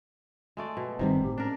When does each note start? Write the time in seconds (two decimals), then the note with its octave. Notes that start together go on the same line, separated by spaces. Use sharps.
0.57 G#3 A3 D5
0.77 B2
0.99 G1 C3 D#3 G3 C4
1.22 A2 G4
1.38 C#4 D4 A#4